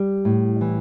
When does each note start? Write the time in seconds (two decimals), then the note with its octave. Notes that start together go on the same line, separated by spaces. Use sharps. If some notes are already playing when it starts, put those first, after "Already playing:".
Already playing: G3
0.25 A2
0.61 E3